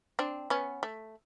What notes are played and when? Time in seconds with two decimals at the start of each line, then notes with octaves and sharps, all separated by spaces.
0.19 C4 D4
0.50 B3 C#4
0.83 A3